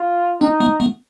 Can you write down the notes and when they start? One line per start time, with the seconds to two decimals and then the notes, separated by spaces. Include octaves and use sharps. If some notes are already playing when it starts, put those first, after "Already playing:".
Already playing: F4
0.41 C4 D4 D#4
0.60 A3 B3
0.80 A3 B3